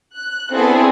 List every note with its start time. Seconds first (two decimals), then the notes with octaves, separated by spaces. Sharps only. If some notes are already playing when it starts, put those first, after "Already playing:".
0.15 F#6
0.54 B3 C4 D4 E4 G#4 A4